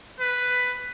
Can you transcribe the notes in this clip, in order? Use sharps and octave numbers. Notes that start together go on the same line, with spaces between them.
B4